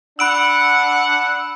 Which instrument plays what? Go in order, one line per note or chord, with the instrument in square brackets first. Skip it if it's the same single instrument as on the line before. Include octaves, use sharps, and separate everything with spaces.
[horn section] D4 F#5 [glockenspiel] B5 D7 F#7 [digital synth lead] E6